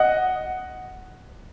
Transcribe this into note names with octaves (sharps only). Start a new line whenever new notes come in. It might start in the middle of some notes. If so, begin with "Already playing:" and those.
Already playing: D#5 F#5